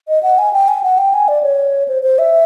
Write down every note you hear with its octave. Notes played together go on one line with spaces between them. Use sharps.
D#5
F#5
G#5
G5
G#5
F#5
G5
G#5
D5
C#5
C5
C5
E5